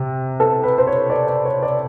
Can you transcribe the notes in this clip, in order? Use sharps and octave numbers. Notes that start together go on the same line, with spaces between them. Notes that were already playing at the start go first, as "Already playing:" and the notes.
Already playing: C3
A4
B4
C5
C#5
D5
D5
C#5
D5